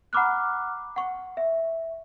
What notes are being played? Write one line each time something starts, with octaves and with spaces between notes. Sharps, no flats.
F#5 A#5 B5 D6 F6 F#6
F#5 C#6
E5